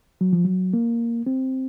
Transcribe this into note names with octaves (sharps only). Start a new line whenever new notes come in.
F#3
F3
F#3
A#3
C4